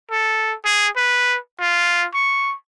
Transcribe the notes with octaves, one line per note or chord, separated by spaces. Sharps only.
A4
G#4
B4
F4
C#6